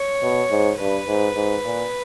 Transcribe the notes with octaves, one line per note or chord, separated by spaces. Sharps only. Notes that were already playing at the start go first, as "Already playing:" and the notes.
Already playing: C#5
B2
G#2
G2 B4
G#2
G#2
A#2